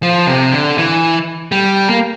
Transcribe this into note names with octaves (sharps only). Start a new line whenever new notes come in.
F3
C3
D3
E3
G3
A#3